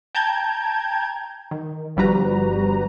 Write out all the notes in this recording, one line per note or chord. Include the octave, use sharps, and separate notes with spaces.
G5 A5 A#5 G6 G#6
D#3
G1 F3 G3 F#4 B4 A#5